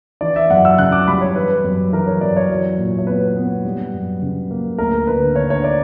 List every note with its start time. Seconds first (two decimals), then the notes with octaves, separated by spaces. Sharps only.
0.21 E3 D5
0.36 E5
0.50 F#2 F#5
0.65 E6
0.78 C#3 F#6
0.92 D6
1.08 G3 B5
1.21 C#5
1.36 E3 B4
1.64 F#2
1.92 E3 A#4
2.07 C#5
2.21 F#2 D5
2.36 C#5
2.50 F#3
2.78 A#2
2.99 C#5
3.07 B3 B4
3.36 B3
3.65 G3
3.93 F#2
4.22 C#3
4.51 A#3
4.78 D2 A#4
5.07 D3 B4
5.36 D3 C#5
5.50 C#5
5.64 D5